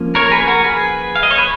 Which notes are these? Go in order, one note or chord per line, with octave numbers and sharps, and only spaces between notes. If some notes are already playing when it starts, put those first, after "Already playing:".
Already playing: F3 A#3 C#4
A#4 C#5
A#4
G#4 B4
F#4 A#4
G#4 B4
F5
D#5
C#5
B4